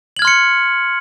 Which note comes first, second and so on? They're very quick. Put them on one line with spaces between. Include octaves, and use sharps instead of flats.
F#7 G#6 F6 C6 C#7